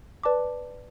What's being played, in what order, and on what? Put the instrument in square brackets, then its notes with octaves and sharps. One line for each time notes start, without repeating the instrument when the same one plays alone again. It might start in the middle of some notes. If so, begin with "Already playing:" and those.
[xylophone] B4 D5 A5 D6